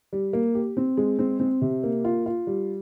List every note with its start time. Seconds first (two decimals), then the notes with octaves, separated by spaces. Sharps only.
0.13 G3
0.33 A#3
0.55 G4
0.77 C4
0.97 G#3
1.19 C4
1.40 C4
1.62 C3
1.84 A#3
2.05 F4
2.26 F4
2.47 G3